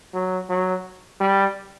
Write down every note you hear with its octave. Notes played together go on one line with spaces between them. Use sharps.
F#3
F#3
G3